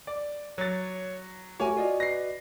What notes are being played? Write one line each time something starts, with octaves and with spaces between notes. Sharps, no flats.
D5
F#3 C#5 A6
A3 F#4 G4 A#4 C#5 G#5
F4 F#4 D5 D#5
B4 A#6 C7